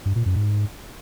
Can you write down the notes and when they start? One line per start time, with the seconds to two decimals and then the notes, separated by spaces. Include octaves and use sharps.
0.06 G2
0.16 A#2
0.26 F#2
0.36 G#2